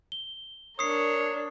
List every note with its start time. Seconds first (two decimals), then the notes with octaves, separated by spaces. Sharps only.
0.12 G7
0.79 D4 A#4 C#5 D#6 C7